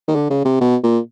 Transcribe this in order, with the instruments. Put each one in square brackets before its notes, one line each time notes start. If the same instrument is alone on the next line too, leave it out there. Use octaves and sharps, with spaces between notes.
[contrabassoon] D#3
D3
C#3
C3
B2
A#2